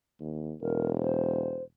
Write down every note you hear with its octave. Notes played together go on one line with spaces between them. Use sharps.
D#2
E1 A#4
C5